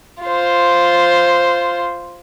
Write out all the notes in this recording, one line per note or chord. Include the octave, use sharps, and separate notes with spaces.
F4 C5